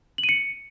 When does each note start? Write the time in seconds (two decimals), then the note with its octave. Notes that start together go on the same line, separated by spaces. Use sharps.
0.18 F#7
0.24 D#7
0.29 C#7